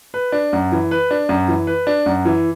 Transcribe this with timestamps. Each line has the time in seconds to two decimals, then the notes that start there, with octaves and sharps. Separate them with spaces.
0.14 B4
0.32 D4
0.53 F#2
0.72 E3
0.91 B4
1.11 D4
1.29 F#2
1.48 E3
1.67 B4
1.87 D4
2.06 F#2
2.25 E3